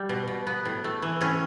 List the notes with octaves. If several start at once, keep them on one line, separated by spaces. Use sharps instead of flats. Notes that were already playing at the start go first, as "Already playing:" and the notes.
Already playing: G3
B2
B2
B3
A2
A3
E3
A2 C#4